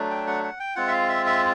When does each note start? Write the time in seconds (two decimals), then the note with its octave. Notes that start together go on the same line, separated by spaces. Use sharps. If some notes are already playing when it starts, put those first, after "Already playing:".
Already playing: F#3 A3 D4
0.11 G5
0.27 F#5
0.43 F#5
0.60 G5
0.76 G#3 C4 F4 F#5
0.88 E5
0.93 F5
1.09 E5
1.26 E5